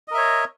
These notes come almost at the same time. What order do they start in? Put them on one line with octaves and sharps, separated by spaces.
D#5 A#4 E5 C#5